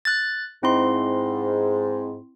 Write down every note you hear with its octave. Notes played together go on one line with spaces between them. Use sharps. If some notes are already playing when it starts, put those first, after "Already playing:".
F#6 A6
G#2 C4 E4 C6